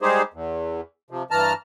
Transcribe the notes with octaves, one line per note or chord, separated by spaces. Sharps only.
G3 G#3 D#4 G4 G#4 C5
E2
C3 F3
G2 E3 A5 A#5 F6